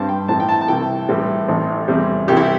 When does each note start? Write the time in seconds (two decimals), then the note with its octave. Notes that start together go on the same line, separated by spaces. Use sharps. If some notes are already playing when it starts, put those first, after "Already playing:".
Already playing: G2 G3 C4 A5
0.09 G5
0.28 A2 E3 A3 C4 A5
0.40 G5
0.49 A5
0.61 A5
0.68 C2 C3 E3 G5
1.09 A2 E3 G3 C4
1.48 A1 A2 A3 C4
1.88 E2 C3 G3 C4
2.28 C2 C3 E3 G4
2.37 E4